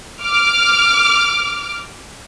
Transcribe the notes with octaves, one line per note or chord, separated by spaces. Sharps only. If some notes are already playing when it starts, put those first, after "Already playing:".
D6 F6